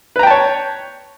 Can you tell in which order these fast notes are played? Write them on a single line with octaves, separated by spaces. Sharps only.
B4 A#5 G5 A5 C#5